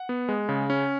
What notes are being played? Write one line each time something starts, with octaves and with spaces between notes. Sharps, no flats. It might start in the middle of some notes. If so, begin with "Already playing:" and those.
Already playing: F#5
B3
G#3
C#3
C#4